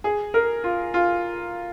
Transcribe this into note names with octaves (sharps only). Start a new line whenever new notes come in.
G#4
A#4
F4
F4